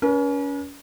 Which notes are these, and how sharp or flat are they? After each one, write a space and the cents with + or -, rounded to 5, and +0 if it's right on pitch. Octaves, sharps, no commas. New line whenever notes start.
C#4 +30 B4 -45